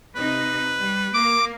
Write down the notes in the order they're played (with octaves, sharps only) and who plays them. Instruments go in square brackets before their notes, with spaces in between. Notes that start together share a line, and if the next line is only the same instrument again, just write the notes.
[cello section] C3 D#4 [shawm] B4
[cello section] G3
[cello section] A#3 [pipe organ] D6